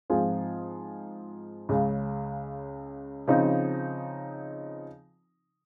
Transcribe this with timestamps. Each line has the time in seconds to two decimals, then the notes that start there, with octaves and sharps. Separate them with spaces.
0.10 G#2 F3 C4 F4 G#4
1.69 C#2 C#3 G#3
3.28 C#3 F3 C4 D#4